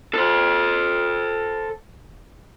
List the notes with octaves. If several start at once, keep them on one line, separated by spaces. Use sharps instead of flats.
A4 C5